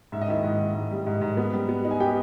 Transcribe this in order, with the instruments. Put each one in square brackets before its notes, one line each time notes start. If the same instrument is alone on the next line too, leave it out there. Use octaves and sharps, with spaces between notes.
[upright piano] G#2 E5
D#5
D#3 E4 E5
G#2
G#2
G#2
G3
G#2
G#2
B3
G3
B3
D#4
G#5
B3 G4 G5